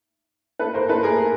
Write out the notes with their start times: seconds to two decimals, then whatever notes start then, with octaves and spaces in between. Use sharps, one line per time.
0.59 A4 B4
0.73 A#4 C5
0.88 A4 B4
1.03 G#4 A#4